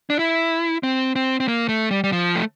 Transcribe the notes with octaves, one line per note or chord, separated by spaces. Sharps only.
D4
E4
C4
C4
C4
A#3
A3
G3
G3
F3
A3